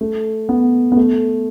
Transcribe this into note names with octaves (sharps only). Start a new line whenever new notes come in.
A3
B3
B3
A3